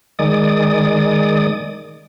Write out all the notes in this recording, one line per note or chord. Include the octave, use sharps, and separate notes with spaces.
D#3 G#3 D5 D#6